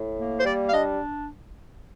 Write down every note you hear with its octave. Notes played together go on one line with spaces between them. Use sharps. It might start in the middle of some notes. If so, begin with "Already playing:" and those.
Already playing: A2
A#3
C5
G3 D5
F5
D4 D#5